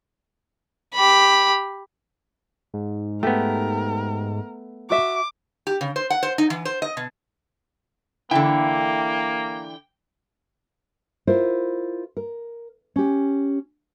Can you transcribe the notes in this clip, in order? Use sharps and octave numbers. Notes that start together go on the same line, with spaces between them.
G4 B5
G#2
A3 B3 G4 A#4
F#4 E5 D6
G4
C#3
C5
F#5
C5
D#4
E3
C5
D#5
B2
D3 E3 A#3 E4 G5
E4 F4 A#4 C5
A#4
C#4 G4